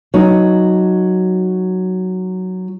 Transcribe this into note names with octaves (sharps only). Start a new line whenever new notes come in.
F#3 D#4